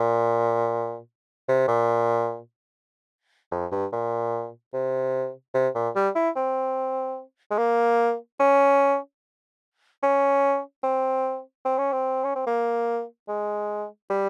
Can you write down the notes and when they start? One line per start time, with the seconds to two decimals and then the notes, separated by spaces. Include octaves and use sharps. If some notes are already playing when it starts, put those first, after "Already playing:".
Already playing: A#2
1.48 C3
1.68 A#2
3.51 F2
3.71 G2
3.92 A#2
4.73 C3
5.54 C3
5.75 A#2
5.95 G3
6.15 E4
6.36 C4
7.51 G#3
7.58 A#3
8.40 C#4
10.03 C#4
10.83 C4
11.65 C4
11.78 C#4
11.93 C4
12.24 C#4
12.35 C4
12.47 A#3
13.28 G#3
14.10 G3